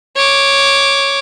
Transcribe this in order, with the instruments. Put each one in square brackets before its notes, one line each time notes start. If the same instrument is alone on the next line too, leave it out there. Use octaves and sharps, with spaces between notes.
[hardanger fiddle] C#5 D6